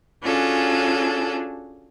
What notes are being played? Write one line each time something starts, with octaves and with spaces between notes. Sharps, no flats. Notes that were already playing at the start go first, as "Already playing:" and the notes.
C#4 D4 F4 F#4 G#4 A4